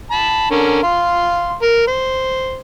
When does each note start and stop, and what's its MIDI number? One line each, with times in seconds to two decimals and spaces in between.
0.11 0.47 81
0.11 0.47 83
0.51 0.80 50
0.51 0.80 61
0.51 0.80 70
0.83 1.56 77
0.83 1.56 84
1.62 1.85 70
1.87 2.61 72